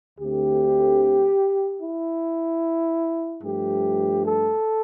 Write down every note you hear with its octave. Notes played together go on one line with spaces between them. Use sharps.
D2 D3 A3 C4 G4
E4
G2 F3 A3 G4
A4